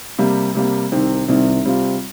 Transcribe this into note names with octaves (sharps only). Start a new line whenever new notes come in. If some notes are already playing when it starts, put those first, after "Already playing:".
C3 G3 A#3
C3 G3 A#3
C2 C3 D#3 C4
C2 C3 D#3 C4
C3 G3 C4 F4